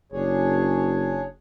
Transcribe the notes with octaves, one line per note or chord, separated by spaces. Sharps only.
F#1 D4 G#4 C#5